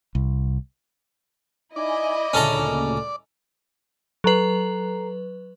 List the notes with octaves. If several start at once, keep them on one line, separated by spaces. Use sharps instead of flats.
C2
D#4 E4 D5 D#5 G#5
D2 A#2 C#3 C#4 A4 A#5
F#3 A4 B4 A#5 C7